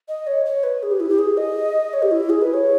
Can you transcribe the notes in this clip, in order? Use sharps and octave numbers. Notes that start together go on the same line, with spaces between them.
D#5
C#5
C#5
B4
G#4
G4
E4
G4
G#4
D#5
C#5
G4
E4
G#4
B4
C#5